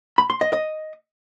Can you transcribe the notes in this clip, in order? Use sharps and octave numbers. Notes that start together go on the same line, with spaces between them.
B5
C6
D#5
D#5